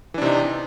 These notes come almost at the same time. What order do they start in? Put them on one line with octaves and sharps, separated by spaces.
E3 D4 C3 D#4